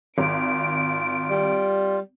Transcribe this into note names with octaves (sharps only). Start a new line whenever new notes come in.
G#1 F4 D7
G3